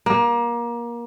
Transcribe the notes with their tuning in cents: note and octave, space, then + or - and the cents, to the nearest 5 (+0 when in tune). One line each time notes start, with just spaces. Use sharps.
A#3 +25